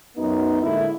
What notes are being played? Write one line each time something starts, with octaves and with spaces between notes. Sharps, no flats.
F#2 B3 D#4
A2 D3 G#3 A#3 E4